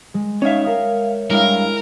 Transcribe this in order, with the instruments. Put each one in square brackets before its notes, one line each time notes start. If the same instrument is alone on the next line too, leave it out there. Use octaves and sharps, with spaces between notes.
[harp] G#3
[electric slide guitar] C#4 D#4 F5 [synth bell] C#5 E5
[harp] A#4 G5 D#6 [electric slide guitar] F5
[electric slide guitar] G2 F5 [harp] G#3 E4 [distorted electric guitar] A#4